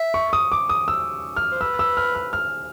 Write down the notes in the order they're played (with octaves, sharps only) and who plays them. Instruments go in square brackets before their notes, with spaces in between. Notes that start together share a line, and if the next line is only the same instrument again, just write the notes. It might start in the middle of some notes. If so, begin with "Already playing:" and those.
Already playing: [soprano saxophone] E5
[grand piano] C#6
D#6
D6
D#6
E6
F6
[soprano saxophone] C5
[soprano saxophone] B4 [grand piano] E6
[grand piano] E6
F6
F6
F6